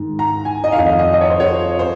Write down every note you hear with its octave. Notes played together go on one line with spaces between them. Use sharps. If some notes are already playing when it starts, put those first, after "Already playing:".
Already playing: G#2 D#3
A#5
G#5
D#5
F2 D#3 F5
D#5
D#5
D#5
C#5
C5
C#5
C5